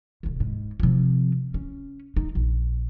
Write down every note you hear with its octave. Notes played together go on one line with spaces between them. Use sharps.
D1 C2
G#2
C3 F3
C#4
D#4
A#1